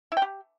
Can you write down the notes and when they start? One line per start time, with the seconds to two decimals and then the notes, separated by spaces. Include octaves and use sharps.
0.12 E4
0.17 G5
0.22 G4